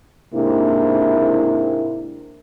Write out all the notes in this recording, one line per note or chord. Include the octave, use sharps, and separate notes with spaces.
G#2 C3 A#3 D4 E4